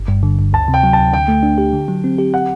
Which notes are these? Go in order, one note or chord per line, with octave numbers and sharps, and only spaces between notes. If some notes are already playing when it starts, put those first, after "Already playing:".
Already playing: G1
G2
D3
G1
D2 A5
C3
G5
F#3
A5
D2
D3 G5
A3
D4
G4
D3
F#3
C4
G4
F#5